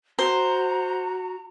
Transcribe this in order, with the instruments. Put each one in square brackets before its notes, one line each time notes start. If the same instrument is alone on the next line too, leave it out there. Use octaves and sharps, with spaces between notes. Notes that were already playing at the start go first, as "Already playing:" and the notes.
[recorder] F#4 [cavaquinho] C5 [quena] A#5